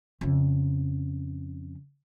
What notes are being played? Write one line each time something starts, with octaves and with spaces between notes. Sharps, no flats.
F2 C#3